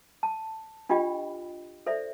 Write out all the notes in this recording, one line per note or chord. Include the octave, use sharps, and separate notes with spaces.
A5
D4 F4 G4 D#5 G5 B5
A4 C5 D5 E5